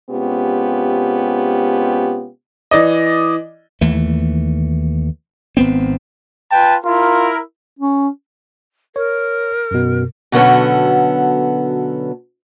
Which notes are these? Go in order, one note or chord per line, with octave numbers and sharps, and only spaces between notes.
C3 G#3 B3 C#4 F4 G4
E3 D5 D#5
D#2 E3 A3
G#1 B3 C4
F4 B4 G5 A5
E4 F4 A#4
C#4
A#4 C#5
F#2 B2
B2 D3 F#3 B3 C#4 A4